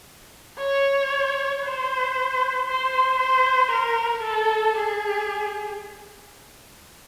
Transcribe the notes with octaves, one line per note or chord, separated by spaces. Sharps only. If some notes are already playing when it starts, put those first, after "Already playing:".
C#5
C5
C5
C5
A#4
A4
G#4